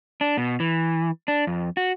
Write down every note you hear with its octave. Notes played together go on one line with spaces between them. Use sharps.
D4
B2
E3
D4
F2
F#4